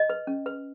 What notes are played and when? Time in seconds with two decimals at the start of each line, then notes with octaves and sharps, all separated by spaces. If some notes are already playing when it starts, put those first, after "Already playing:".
Already playing: D#5
0.10 B4
0.27 C#4
0.46 B4